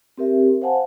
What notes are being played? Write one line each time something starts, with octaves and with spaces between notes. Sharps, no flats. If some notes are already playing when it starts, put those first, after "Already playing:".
C4 G4 A#4 E5
C5 F5 F#5 G#5 A5